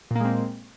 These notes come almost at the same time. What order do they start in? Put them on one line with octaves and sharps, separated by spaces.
A#2 A#3 G#3 C4